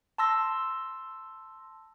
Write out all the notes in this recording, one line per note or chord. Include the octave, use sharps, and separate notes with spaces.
A5 C6 E6 A#6